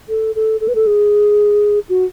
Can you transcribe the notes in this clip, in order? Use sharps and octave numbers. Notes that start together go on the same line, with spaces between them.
A4
A4
A4
B4
A4
G#4
F#4